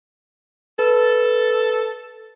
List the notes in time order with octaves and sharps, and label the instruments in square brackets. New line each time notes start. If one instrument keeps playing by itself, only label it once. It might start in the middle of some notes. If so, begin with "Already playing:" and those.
[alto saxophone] A4 [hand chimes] B4